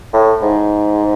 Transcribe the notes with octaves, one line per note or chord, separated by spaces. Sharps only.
A2
G#2